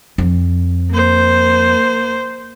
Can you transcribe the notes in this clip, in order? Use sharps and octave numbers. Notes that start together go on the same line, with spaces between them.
F2
A#3 C5